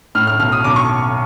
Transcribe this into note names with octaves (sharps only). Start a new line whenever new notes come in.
A2 F6
F6
B1 F6
D#6
B1 D6
C#6